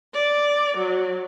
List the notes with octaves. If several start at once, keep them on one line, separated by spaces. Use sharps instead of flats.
D5
F#3